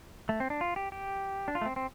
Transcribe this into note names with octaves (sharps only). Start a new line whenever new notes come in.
A3
C4
D4
F4
G4
G4
D4
F4
A3
C4
C4